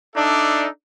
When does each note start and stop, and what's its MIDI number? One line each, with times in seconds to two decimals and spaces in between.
0.15 0.67 62
0.15 0.67 63
0.15 0.67 69
0.15 0.67 74
0.15 0.67 76